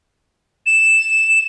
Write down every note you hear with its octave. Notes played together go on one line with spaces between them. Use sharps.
E7